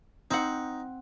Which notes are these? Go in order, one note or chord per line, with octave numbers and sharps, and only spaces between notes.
C4 D#4 F#5